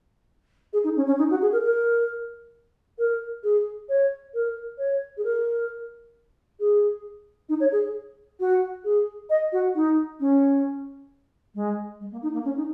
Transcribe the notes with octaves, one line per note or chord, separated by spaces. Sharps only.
G#4
D#4
C#4
C#4
D#4
F#4
G#4
A#4
A#4
A#4
G#4
C#5
A#4
C#5
G#4
A#4
G#4
D#4
C#5
G#4
F#4
G#4
D#5
F#4
D#4
C#4
G#3
G#3
A#3
D#4
A#3
C#4
D#4